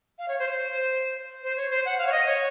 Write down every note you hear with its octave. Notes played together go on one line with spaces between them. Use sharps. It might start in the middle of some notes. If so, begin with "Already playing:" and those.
F5
C#5
C5
C5
C5
C#5
C5
F#5
F5
C#5
D#5
C#5